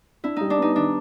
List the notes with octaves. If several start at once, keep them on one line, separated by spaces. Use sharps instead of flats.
D4 E4
G3 D#4
D4
B3 D#4
D#3 D4